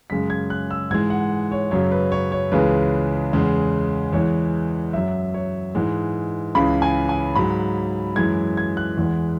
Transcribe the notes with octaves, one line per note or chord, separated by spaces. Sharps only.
F#2 C#3 G#3 B6
G#6
F#6
E6
G#2 E3 G#3 G#6
F#5
C#5
F#2 C#3 F#3 C#5
B4
C#5
C#5
C#2 C#3 E3 G#3 B4
E2 C#3 G#3
E2 E3 G#3 C#5
F#2 F#3 E5
C#5
G#2 E3 G#3
C#2 C#3 E3 B5
G#5
G#5
G#2 F#3 B5
F#2 E3 G#3 G#6
G#6
F#6
E2 E3 G#3